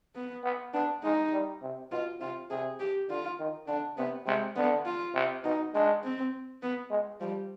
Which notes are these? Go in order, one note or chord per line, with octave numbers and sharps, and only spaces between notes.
B3
B3
B3 D4
G#3 D#4
G3
C3
B2 F4
C3 F4
C3 G#4
G4
D3 F4
D#3
D3 D4
C3 B3
C3 G#3
D3 B3
F4
C3
B2 D#4
G#3 D4
C4
B3
G#3
F3 G3